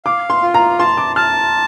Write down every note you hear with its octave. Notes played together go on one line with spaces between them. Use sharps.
F5 D6
C6
F4
A#5
A5 C6
D6
A5 F6